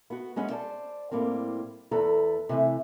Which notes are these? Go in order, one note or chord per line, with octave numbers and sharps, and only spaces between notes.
B3 F#4
G#3 B3 C#4 F#5
C5 D5 A5
A2 G3 A#3 C4
E2 A4 B4 A#5
C3 E3 A3